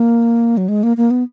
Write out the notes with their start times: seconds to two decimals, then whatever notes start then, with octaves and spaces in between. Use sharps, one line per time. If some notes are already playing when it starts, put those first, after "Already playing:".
Already playing: A#3
0.57 F#3
0.68 G#3
0.83 A#3
0.97 A#3
1.11 B3